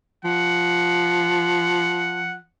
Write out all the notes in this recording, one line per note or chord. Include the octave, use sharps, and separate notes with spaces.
F3 F#5